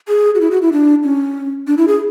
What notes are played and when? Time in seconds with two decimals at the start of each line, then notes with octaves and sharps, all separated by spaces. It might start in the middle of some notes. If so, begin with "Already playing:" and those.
0.08 G#4
0.35 F#4
0.41 E4
0.51 F#4
0.62 E4
0.73 D4
1.04 C#4
1.67 D4
1.78 E4
1.88 G#4